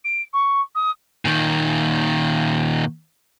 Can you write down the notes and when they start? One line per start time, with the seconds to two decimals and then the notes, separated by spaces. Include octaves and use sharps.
0.04 D7
0.33 C#6
0.75 D#6
1.25 A#2 D#3